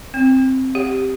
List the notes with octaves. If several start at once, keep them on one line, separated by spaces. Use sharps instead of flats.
C4
G4